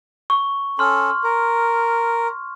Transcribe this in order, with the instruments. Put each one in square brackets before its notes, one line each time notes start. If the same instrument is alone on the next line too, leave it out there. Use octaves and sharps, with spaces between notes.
[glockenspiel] C#6
[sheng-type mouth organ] C#4 A4 [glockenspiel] C6 F6
[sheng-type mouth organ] A#4